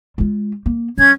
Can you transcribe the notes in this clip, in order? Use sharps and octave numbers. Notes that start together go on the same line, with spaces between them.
G#3 F4
A#3
F#3 C#4 G#6